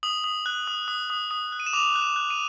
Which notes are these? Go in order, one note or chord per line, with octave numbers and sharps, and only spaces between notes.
D#6 F#7
D#6
F#6
D#6
D#6
D#6
D#6
F#6
D#7
E7
D6 F7
F#6
E7
F#6
D#7